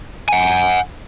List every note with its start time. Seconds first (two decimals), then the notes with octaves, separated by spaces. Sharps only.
0.29 F#5 G#5